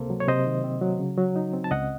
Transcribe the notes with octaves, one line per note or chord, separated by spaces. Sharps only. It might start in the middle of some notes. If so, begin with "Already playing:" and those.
Already playing: C#2 C3 A#3 A4 C5
F#3
C#5
C3 C5 D#5
D#3
C4
F#3
C#3
F#3
D#4
C4
A5
C#2 D#5 F#5